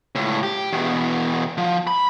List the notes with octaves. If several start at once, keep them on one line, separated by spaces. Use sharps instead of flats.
C#2 A2
G4
E2 B2
F3
B5